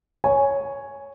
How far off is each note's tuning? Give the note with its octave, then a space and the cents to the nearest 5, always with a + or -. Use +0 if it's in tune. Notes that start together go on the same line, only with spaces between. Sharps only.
C#5 +0 G#5 +0